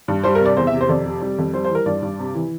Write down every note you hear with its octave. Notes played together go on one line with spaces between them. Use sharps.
G2
G3 C5
A#4
C3
D5
E2 C5
E5
C3
C5
F2 D5
C3
G3
F2
G3 C5
C5
E3
A#4
G2 D5
G2
C3
E3